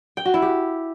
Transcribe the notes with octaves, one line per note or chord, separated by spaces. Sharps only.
G5
F#4
E4
G4